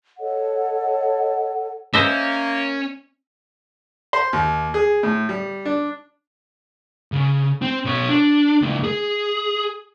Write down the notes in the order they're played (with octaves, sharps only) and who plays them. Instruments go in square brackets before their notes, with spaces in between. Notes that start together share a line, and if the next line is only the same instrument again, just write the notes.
[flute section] A4 C#5 D#5 F#5
[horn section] A#3 [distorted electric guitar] C#4 [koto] C5 D#5 E5
[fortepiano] C5
D#2
G#4
A2
G3
D4
[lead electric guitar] C#3
C4
B2 C#5
D4
C#2 A#3
G#4